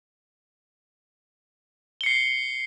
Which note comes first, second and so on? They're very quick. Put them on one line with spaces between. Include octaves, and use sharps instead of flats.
G7 C#7 C7